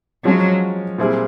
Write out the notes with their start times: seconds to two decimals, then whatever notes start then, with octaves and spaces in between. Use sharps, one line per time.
0.25 F3 F#3 G#3 C#4
0.98 A#2 G3 C4 E4 G#4